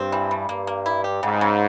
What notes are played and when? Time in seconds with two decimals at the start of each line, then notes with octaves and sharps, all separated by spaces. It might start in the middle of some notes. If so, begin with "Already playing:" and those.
Already playing: G2 C4
0.12 E3
0.31 G3
0.49 G2 A#3
0.67 A#3
0.86 E4
1.04 G4
1.23 G#2 C#3
1.41 C#3